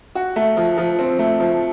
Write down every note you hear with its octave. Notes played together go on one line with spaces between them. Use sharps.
F#4
A3
F3
F3
C4
A3
F3